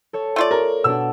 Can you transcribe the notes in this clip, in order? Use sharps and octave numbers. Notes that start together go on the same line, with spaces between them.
A4 C#5
A3 F4 D5
A#4
B2 D4 E6